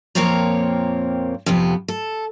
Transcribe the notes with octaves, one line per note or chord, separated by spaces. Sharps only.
F2 A#2 A#3 C4 C#5 A#5
F2 C3 B3
A4